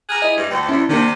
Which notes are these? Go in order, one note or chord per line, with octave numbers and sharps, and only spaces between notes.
G#4 A#5 F6 F#6
E4 D#5
G2
D2 G5
D2 C#4 E4
C3 D#3 A#3 D4